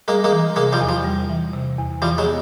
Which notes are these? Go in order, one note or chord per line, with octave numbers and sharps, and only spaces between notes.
G3 G#3 A#3
G#3 A#3
E3
C3 G#3 A#3
F3 G3
E2
F3
G3
E3
C3
E2
E3 F3 G3
F#3 G#3
B3